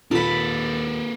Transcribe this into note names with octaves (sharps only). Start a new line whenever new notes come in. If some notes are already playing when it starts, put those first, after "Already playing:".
D#2 A#2 A#3 A4 B4 B5